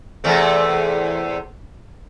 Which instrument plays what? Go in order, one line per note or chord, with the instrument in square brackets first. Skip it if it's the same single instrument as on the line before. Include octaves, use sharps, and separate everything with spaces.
[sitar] E2 C3 A3